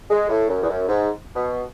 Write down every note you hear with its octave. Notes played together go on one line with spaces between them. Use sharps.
G#3
A2
F#2
E2
F#2
G#2
B2